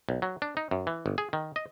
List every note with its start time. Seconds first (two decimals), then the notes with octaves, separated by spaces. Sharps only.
0.09 B1
0.22 F#3
0.42 D4
0.57 D#4
0.71 F#2
0.87 E3
1.06 G1
1.18 G#4
1.33 D#3
1.56 D#5